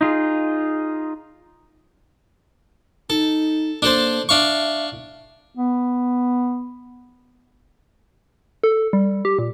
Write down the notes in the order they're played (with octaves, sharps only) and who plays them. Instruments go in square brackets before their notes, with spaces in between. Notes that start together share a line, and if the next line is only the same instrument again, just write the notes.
[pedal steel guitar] D#4 F4 G#4
[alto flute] D#4 [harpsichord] A4
[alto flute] A#3 [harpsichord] D4 A4 C5
[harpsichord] D4 F5 C#6 [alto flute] E5
[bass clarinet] B3
[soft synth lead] A4
G3
G4
A#2